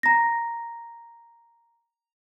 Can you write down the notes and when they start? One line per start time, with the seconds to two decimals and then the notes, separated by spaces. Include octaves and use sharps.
0.03 A#5 A#6